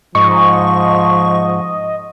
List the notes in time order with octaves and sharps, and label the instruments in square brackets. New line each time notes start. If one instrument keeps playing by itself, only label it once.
[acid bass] G#2 [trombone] F3 [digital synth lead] D#5 [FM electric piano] C#6